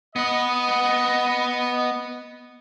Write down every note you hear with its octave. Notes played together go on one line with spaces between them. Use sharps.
B3 B4 D#5